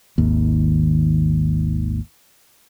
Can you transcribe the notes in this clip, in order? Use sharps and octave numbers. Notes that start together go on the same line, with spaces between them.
G#1 D#2